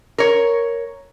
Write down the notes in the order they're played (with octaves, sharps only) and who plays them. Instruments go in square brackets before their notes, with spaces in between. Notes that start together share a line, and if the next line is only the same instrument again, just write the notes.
[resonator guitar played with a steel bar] A#4 C#5